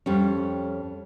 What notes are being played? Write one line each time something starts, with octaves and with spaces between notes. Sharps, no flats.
F2 G3 C#4